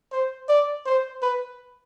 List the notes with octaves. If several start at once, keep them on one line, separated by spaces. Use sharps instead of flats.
C5
D5
C5
B4